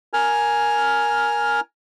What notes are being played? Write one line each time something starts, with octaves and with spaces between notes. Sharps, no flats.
A#4 G#5 F6